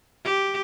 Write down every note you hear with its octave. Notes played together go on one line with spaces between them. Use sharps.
G4